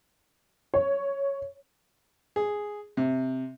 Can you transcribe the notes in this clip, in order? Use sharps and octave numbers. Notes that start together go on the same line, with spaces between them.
C#5
G#4
C3